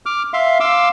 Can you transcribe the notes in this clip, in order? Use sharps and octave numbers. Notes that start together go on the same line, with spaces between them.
D6 F6
E5 F5 C6
F5 C6 D6 E6